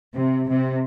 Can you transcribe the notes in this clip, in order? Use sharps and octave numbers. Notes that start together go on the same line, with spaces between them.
C3
C3